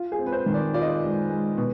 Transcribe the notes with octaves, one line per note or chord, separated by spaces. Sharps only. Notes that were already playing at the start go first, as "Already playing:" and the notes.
Already playing: F4
G#4
C4
B4
C5
D#3
D5
F4 D5
D#5
D5
G#3
G#3
B2